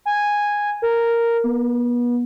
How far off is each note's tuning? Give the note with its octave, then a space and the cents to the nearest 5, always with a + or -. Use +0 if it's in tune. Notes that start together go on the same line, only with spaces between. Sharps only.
G#5 -5
A#4 -5
B3 -35